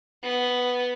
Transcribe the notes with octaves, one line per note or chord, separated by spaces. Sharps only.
B3